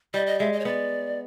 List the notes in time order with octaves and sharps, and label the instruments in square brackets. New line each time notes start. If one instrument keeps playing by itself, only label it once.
[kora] G3 [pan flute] D#5
[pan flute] D#5
[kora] G#3 [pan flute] E5
[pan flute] D#5
C#5
[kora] B3 [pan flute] D5